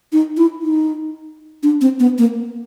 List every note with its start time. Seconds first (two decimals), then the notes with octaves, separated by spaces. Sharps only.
0.13 D#4
0.37 E4
0.63 D#4
1.63 D4
1.81 C4
2.00 B3
2.18 A#3